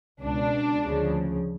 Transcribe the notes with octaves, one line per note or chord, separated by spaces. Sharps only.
C#2 B2 D4
D2 C#3 F3